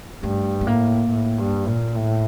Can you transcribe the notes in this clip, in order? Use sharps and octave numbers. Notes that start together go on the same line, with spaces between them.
G2 A3
A3
A2 A#3
A2
G2
A#2
A2